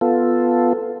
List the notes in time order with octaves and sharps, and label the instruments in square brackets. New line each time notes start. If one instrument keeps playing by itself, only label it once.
[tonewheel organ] B3 F4 A4